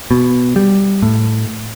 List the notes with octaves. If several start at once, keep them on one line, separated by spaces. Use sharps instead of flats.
B2
G3
A2